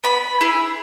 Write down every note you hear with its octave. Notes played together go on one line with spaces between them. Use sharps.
B3 B5
E4 G#4